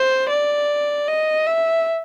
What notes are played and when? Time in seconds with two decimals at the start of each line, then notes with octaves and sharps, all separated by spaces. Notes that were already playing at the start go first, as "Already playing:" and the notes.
Already playing: C5
0.30 D5
1.08 D#5
1.47 E5